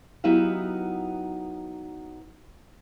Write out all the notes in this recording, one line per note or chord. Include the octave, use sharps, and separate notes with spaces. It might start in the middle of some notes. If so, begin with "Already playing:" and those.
F#3 B3 D#4 E4 G4 F5